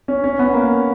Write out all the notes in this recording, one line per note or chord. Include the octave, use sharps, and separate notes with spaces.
C#4
C#4
B3
A#3